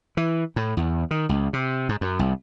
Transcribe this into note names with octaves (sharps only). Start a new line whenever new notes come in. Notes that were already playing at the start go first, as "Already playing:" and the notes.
E3
A2
E2
D#3
C#2
C3
G#2
F#2
C2